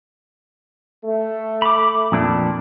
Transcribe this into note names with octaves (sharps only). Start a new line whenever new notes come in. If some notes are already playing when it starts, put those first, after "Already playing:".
A3
B5 D6
F2 A#2 D4